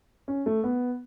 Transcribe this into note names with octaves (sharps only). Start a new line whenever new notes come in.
C#4
A3
B3